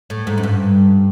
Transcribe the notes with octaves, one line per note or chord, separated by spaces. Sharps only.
A2
G#2
F#2
G2